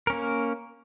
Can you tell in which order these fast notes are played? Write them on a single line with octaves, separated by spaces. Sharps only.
A#4 C#4 A#3